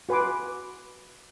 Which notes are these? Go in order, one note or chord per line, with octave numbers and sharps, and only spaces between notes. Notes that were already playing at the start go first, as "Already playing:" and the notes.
F#4 B4 G#5 C6 D6